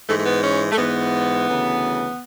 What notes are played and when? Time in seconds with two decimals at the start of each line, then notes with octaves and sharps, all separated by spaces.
0.08 G#2 E3 A3
0.19 A3
0.26 B3
0.43 C#4
0.71 A3
0.77 G#2 E3 B3
1.47 D2 C#3 E3